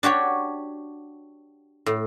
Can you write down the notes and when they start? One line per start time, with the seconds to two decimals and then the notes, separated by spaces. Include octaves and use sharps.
0.03 D4 F#4 G4 C#5
1.86 A2